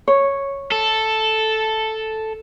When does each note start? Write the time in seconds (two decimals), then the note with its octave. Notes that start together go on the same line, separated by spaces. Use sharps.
0.08 C#5
0.71 A4